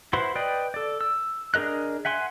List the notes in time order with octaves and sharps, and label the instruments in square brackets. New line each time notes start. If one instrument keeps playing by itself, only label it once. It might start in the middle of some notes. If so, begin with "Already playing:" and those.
[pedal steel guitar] E4 F#4 B4 C5 C6
B4 D5 D#5 G5
A4 D5
E6
D4 G#4 A#4 D#5 F#6
E5 F#5 G#5 C6